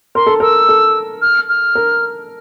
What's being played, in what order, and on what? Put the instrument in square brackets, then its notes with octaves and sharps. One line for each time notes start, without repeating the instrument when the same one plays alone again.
[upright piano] A#4 [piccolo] C6
[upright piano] A4
[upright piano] A#4 [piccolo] E6
[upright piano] A4
[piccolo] F6
F6
[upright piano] A#4